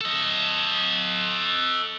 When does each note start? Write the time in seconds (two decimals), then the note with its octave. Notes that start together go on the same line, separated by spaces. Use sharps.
0.01 A4 D#5